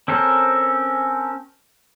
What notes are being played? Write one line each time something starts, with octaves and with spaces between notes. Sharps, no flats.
C4 C#4 A4 A#4 C5